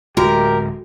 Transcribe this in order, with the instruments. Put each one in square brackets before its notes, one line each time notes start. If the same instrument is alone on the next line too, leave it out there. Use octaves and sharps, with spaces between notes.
[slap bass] D1 G#3 [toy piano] F#4 [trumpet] G4 [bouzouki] A#4